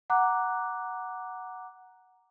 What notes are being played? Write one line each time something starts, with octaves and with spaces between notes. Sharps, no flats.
F#5 A#5 D6 F#6